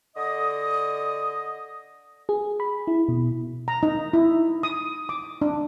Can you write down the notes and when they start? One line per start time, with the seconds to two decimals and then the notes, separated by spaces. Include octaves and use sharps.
0.16 D3 D#5 D#6
2.29 G#4
2.60 B5
2.87 E4
3.09 B2
3.68 A#5
3.83 D#4
4.13 E4
4.63 D#6
5.09 D6
5.42 D4